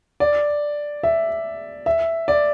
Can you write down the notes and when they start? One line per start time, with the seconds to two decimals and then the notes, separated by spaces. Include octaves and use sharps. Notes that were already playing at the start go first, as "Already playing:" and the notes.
0.20 D5
1.03 E5
1.86 E5
2.28 D5